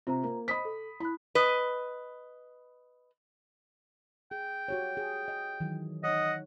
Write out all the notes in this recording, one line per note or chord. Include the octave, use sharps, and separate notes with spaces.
C3 F4 C5 A#5
A#3
C5 D#5 B5 D#6 B6
A4
E4 B5 F#6
B4 D#5
G#4 G5
F#4 G4 C#5
G#4
D#5
D#3 E3 F#3
D#4 C#5 D#5 F#5